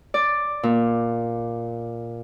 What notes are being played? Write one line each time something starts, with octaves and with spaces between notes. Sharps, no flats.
D5
A#2